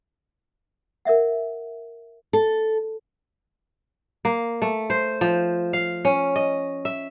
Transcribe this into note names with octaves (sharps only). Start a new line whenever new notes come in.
A#4 D5 E5 F#5
A4
A#3
A3
C5
F3
F5
C#4
D#5
E5